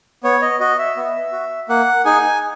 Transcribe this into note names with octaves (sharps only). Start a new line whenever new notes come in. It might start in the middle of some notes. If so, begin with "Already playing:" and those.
B3 C#5
D#5
F#4 D#5
E5
B3
F#4
A#3 F#5
D#4 G#4 G#5